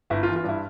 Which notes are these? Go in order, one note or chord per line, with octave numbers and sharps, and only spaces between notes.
G1 E4
F4
E3
F4
G2 E4